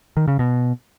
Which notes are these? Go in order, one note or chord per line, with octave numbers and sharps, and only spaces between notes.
D#3
C#3
B2